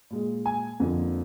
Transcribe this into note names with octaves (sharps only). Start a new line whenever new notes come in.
A#2 G#3
G#5
F2 D3 F3 A#3